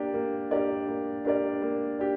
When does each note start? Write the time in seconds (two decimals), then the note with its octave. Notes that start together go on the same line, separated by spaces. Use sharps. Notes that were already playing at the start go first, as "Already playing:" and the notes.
Already playing: A#3 D4 G4 A#4 D5
0.14 A#3
0.51 D4 G4 A#4 D5
0.88 A#3
1.25 D4 G4 A#4 D5
1.62 A#3
1.99 D4 G4